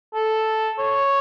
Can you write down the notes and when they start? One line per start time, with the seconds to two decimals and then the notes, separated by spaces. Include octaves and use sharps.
0.14 A4
0.79 C#5